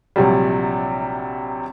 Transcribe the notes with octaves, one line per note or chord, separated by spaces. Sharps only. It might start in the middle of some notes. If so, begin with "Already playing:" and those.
A#1 C3 F#3 G3